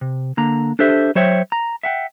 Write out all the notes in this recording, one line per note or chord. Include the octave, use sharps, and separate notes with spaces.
C3
D3 A#3 A#5
D4 G4 A4 C5 E5
F#3 C5 C#5 E5 G5
A#5
E5 F#5 G5